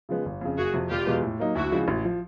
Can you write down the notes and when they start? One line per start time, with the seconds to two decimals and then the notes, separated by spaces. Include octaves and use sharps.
0.09 C#3 F3 G#3 B3
0.25 G1
0.41 F2 C#3
0.58 F#1 F#4 G#4
0.74 F2 C3
0.90 E1 F4 G4
1.07 E2 B2 G#3 B3
1.23 A2
1.39 F#3 A#3 D#4
1.55 D2 E4 F#4
1.71 C#3 F3 G#3
1.88 A1
2.04 F3